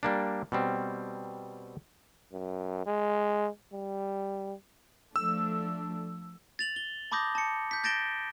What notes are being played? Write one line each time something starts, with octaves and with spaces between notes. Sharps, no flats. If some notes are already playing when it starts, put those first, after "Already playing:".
G3 A#3 D4
B2 G3 C4
F#2
G#3
G3
F3 A3 D4 E6
A6 F7 F#7
G7
A5 B5 D6 D#6 G6 A#6
A5 C#7
G6 B6
G6 A6 A#6 D7 E7 G7